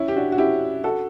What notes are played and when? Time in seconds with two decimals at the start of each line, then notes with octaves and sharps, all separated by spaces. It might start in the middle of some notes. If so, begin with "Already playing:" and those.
Already playing: C#4 E4
0.08 G4
0.16 D4 F#4
0.32 F#4
0.38 E4 G4
0.84 F#4 A4